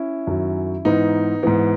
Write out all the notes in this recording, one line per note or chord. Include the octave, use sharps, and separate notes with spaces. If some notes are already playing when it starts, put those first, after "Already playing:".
Already playing: C#4 E4
F#2 D#3 F#3
G#2 E3 B3 D#4
G#2 E3 B3